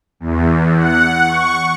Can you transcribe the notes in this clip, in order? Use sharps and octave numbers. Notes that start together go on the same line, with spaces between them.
E2
F#5
C#6